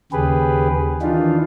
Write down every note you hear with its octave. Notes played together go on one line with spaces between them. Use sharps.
D#2 C#3 G4 G#4 B4
D#3 E3 D4 D#4 F4